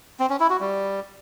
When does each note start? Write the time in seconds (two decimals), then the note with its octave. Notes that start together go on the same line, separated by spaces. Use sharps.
0.20 C4
0.30 C#4
0.40 E4
0.50 F#4
0.60 G3